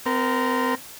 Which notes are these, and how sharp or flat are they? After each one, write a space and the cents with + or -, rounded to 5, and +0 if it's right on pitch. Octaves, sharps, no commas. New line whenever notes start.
C4 -35 A#4 +0